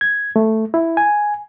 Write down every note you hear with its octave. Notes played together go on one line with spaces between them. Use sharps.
G#6
A3
E4
G#5